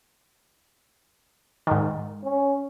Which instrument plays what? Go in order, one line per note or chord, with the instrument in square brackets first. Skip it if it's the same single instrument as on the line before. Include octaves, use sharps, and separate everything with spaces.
[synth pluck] G#2 D#3
[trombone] C#4